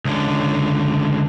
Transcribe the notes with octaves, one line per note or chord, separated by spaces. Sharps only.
C#2 D3